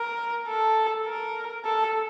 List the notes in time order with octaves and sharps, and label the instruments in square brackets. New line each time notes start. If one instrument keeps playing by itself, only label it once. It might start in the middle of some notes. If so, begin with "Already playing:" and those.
Already playing: [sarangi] A#4
A4
A#4
A4